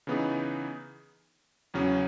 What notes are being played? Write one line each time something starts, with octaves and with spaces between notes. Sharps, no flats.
C#3 E3 B3 D#4 G#4
E2 C#3 F#3 C#4 G#4